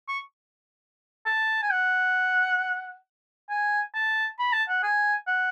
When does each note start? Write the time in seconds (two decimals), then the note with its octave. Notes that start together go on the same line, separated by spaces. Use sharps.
0.08 C#6
1.26 A5
1.62 G#5
1.72 F#5
3.49 G#5
3.95 A5
4.39 B5
4.53 A5
4.69 F#5
4.83 G#5
5.27 F#5